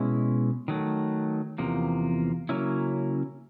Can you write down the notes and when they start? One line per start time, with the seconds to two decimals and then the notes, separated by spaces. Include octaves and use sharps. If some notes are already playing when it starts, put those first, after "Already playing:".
Already playing: B2 G#3 C#4 E4
0.68 D#3 F#3 A3
1.58 E2 C3 F3 A#3
2.49 C#3 F#3 A#3 C#4 E4